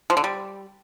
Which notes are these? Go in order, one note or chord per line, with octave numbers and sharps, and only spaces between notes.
F3
D3
G3